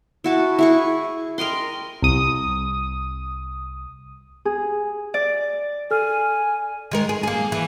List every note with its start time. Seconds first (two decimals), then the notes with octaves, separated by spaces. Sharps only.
0.24 E4 F#4 A5
0.59 E4 G#4 C#6
1.38 A#4 D#5 G5 C6
2.03 C2 D#6
4.45 G#4
5.14 D5
5.91 A4 G#5 F6
6.91 D#3 G#3 A#4
7.09 G#4
7.23 A#3 G#4
7.52 E3